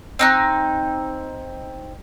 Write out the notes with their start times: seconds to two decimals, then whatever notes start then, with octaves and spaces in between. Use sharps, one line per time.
0.19 C4 D#4 F#6